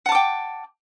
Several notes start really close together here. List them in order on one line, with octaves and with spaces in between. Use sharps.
F#5 A5 D6 G5